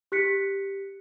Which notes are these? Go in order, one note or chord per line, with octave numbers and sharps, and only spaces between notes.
G4 F#6 B6 C#7